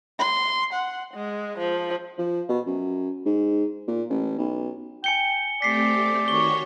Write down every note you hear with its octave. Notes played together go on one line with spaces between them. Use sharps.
C6
F#5
G#3
F3
F3
B2
F#2
G#2
A#2
A1
B1
G5 G#5 C#7 G7
A3 C4 G4 D5 B6 C7
D#3 F#4 C#5 C#6 G7